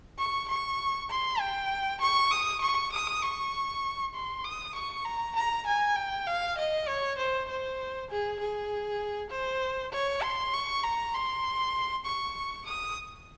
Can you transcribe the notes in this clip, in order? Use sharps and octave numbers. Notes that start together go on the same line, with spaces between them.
C#6
C#6
C6
G5
C#6
D#6
C#6
D#6
C#6
C6
D#6
C#6
A#5
A#5
G#5
G5
F5
D#5
C#5
C5
C5
G#4
G#4
C5
C#5
C6
C#6
A#5
C6
C#6
D#6